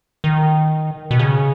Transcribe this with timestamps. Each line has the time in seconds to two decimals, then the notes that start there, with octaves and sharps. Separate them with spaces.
0.24 D#3
1.11 B2
1.19 C#3